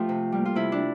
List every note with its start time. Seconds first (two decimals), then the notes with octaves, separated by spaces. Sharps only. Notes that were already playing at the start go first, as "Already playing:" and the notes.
Already playing: F3 A3 F4 G4
0.09 C3
0.32 G3 A#3
0.45 F4
0.55 C3 E4
0.72 D4